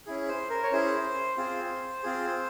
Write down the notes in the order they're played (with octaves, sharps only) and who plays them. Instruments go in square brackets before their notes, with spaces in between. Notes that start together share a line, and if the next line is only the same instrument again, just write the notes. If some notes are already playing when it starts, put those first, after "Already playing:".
[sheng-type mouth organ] C#4 E4 G#4
C5
A#4
C#5
C#4 E4 G#4 C5
C4 F4 G#4
C4 F4 G#4